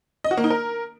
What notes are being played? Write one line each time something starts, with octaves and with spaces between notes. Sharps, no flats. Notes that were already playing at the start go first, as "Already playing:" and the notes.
D#5
F#4
A#3
D#4
A#4